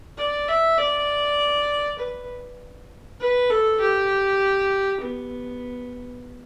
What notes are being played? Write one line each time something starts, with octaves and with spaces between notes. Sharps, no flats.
D5
E5
D5
B4
B4
A4
G4
B3